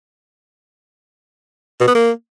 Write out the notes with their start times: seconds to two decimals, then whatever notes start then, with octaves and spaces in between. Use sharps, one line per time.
1.80 B2
1.87 B3
1.94 A#3